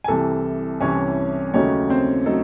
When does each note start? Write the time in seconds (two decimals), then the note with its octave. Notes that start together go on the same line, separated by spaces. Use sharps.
0.04 G#5
0.08 C2 C3 E3 A4 A5
0.80 C2 C3 E3 C#4 C#5
1.54 D#2 C#3 F#3 A3 C#4 D#4 C#5
1.90 C4 C5
2.26 F#3 A3 D#4 A4